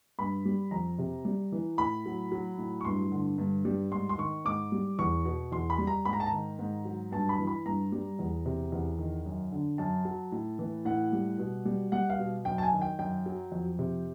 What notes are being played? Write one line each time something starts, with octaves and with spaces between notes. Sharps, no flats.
G2 B5
G3
F2 A#5
C3
G3
E3
A2 B5
F#3
F#3
A2
C#6
G2 C6
D3
G2
G3
G#2 C6
C6
D#3 C#6
G#2 D6
G3
E2 C#6
B2
E2 C6
B5
G3
A#5
G#2 B5
A#5
A5
A#5
D#3
G#2
F#3
G2 A5
B5
E3
B5
G2 A#5
G3
E2
C3
E2
D#3
F#2
D3
F#2 A5
F#3
A2
E3
A2 F#5
G3
B2
G3
G3 F#5
F5
B2
F#2 G5
A5
G#5
D#3
G5
F#2 G5
F#3
F2
C3